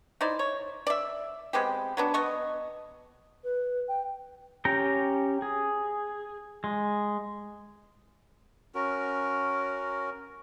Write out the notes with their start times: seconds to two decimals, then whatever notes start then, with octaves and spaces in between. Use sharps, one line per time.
0.21 D#4 E4 C5 D5
0.39 C#5
0.87 D5 E5
1.53 G#3 B3 C4 G4
1.97 F#3 B3 D4
2.14 B3 D#5 C#6
3.44 B4
3.88 G5
4.65 C#4 G4 G5 A#5
5.42 G#4
6.64 G#3
8.75 C#4 F#4 A#4